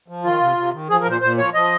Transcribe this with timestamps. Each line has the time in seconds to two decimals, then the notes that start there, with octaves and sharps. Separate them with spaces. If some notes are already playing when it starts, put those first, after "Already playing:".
0.08 F3
0.24 D#3 F4
0.40 C3
0.57 C3
0.73 D#3
0.89 F3 G#4
1.00 A#4
1.05 A#2
1.11 C5
1.21 A#2 C5
1.38 F3 C#5
1.54 F3 D#5